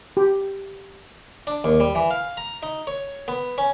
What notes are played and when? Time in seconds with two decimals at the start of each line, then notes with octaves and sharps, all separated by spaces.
0.17 G4
1.47 D4
1.64 D#2
1.80 G3
1.95 E3
2.11 F5
2.37 A#5
2.63 D#4
2.87 C#5
3.28 B3
3.58 C#4